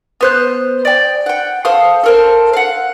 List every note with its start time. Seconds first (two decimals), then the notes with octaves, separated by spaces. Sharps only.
0.21 B3 C5 F#6
0.85 D5 G5
1.26 F#5 G5
1.65 A4 C5 F5 D#6
2.04 A4 A#4 C5
2.53 F5 F#5